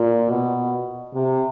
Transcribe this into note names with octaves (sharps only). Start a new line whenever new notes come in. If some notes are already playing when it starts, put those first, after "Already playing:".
Already playing: A#2
B2
C3